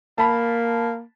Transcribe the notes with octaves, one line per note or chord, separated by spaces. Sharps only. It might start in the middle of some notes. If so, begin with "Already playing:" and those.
A#3 A5 B5